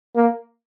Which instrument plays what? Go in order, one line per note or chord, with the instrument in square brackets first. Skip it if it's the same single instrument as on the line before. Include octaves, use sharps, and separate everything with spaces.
[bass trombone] A#3